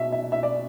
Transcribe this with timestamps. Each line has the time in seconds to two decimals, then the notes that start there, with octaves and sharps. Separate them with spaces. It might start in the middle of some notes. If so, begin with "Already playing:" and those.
Already playing: B2 E5
0.12 E5
0.32 E5
0.43 D5